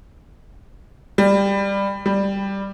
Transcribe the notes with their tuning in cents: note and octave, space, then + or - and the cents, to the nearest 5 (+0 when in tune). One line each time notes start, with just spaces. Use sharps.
G3 +15
G3 +5